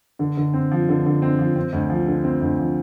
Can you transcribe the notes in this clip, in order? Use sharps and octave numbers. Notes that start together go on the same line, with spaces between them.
D3
D3
C4
F3
D3
D3
C4
F3
C4
D2
F3
D3
C4
D2
F3